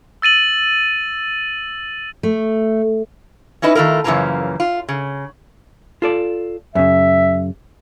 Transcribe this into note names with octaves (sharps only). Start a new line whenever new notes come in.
E6 A6 D#7 F#7
A3
C#4 D#4 E4 B4 D#5
D#3 A3 E4 F4 A#4
F#2 C#3 E3 F3 A#3 A#5
F4
C#3
F4 A4 D5
F#2 C#3 E5